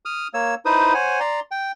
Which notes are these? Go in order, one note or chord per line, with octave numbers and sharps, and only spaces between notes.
D#6 F6
A#3 C#5 E6
D#4 E4 B4 C5 D#6
C5 C#5 F#5 G#5
D5 A#5 C6
G5